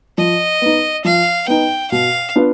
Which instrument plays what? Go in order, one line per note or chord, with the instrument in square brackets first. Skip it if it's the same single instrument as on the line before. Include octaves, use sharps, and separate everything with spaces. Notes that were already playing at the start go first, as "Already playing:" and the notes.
[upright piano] F3 [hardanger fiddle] D#5
[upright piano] B3 D#4
[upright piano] F3 [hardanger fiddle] F5
[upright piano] B3 D#4 [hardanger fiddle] G5
[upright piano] B2 [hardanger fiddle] F5
[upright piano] B3 D4 F4